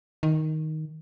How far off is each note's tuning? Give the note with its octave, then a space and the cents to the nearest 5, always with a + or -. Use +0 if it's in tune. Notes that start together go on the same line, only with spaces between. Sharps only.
D#3 +5